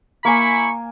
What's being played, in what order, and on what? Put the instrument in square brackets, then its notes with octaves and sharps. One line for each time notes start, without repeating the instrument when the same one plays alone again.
[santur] A#3 G#5 [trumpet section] E4 B5 C#6